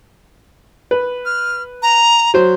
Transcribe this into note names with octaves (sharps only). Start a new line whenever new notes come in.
B4
F6
A#5
F#3 C5